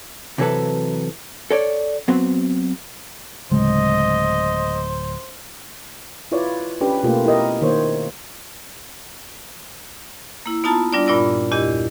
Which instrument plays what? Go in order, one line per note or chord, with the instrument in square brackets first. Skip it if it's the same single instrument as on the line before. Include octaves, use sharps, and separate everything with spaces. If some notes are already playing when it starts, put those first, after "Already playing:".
[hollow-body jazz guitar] C3 E3 F#3 A4 B4
A4 C#5 D5
F#3 B3 C4
[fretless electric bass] D1 [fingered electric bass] C#3 G#3 [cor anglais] C5 [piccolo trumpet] D#5
[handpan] E4 F4 B4 C#5 D5
C#4 D4 G4 B4
B2 A3 A#3 F4 G4
E4 G4 A#4 D#5
D#3 A#3 C5 C#5
[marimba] A#3 E4
B3 D#4 F4 A5 A#5 A6
G3 D4 F4 D5
G2 A#2 F4 D5 E6 A#6
E2 A#2 E4 G4 D#5